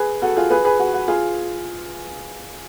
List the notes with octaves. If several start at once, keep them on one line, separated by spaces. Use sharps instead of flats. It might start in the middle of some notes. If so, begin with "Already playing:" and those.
Already playing: G#4 B4
F#4 A4
F4 G#4
G#4 B4
G#4 B4
F#4
F#4
F4 G#4